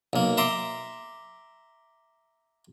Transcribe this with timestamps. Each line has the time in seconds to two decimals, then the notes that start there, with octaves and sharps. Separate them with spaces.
0.13 B1 A#3
0.37 E5 A#5 C6 D6